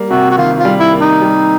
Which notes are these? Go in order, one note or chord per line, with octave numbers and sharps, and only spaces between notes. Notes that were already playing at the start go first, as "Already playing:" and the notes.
Already playing: G3 A#3
C3 F#4
F#4
D#3 F4
F4
G3
E4
A#3
D#4
G3